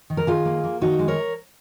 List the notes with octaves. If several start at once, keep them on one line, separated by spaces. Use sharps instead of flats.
D#3
A#4
D#3 F4 G#4
A#3
A#3
D#3 D#4 F#4
G#3
A#4 C#5